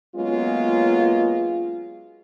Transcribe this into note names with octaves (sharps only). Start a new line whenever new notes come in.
F#3 G#3 A#3 B3 C#4 F4